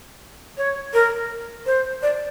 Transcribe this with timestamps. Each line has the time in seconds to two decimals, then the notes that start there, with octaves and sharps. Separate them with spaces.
0.58 C#5
0.94 A#4
1.66 C5
2.02 D5